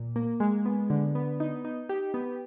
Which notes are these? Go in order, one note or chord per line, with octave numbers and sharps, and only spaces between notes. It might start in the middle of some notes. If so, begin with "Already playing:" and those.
Already playing: A#2
A#3
G#3
B3
D3
B3
D#4
D#4
G4
B3